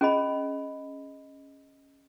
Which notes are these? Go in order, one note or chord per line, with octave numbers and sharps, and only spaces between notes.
C#4 G#4 D#5 B5